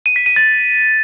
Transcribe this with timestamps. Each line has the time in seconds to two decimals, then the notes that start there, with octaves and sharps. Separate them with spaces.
0.06 D#7
0.16 B6
0.26 D#7
0.36 A6